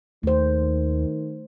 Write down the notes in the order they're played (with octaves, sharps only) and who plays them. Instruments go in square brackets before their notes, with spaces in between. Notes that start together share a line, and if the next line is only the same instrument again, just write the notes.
[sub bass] D#2 [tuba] D#3 [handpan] A3 C5